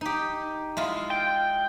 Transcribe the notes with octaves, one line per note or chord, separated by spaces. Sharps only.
D#4 G4
G#3 E4 F4
G5